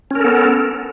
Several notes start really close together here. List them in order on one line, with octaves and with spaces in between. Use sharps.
C#4 A#4 A4 B3